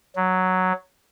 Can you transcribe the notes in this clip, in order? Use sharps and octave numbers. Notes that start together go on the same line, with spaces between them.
F#3